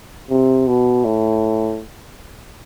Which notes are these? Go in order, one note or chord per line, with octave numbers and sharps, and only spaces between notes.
C3
B2
A2